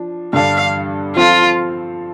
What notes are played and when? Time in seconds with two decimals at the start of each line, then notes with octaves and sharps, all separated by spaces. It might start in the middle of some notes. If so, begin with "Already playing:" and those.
Already playing: F3 D4
0.33 G2 D3 G3 D4 A4 F5
1.16 F3 C4 F4 A4 F5